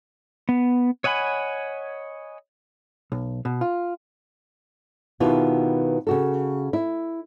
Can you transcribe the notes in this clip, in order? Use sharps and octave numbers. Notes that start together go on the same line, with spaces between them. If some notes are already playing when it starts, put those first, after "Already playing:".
B3
C#5 D#5 F#5 G#5 B5
B1
B2
F4
B2 D#3 B3 E4 F4 G4
C#3 F#4 A4
E4